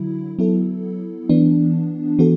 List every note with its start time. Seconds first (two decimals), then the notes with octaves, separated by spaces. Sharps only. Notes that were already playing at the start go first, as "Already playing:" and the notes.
Already playing: D3 F#3 E4
0.39 F#3 B3 E4 A4
1.29 E3 B3 D4
2.19 E3 B3 F#4 A4